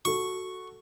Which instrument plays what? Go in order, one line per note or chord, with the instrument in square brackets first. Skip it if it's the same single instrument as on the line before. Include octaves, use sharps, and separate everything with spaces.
[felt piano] F#4 A4 [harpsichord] C#6